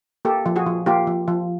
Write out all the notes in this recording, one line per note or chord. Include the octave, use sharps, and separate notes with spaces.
A#3 G4 A4
F3
F#4 G#4
F3
A#3 F4 G4
F3
F3